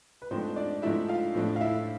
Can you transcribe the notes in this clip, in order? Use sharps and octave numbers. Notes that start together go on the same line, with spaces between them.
B4
G#2 F3 A3 C4 D4 C5
D4 D5
G#2 F3 A3 D4 E4 E5
F4 F5
A2 F3 A3 D4
F5
E4 E5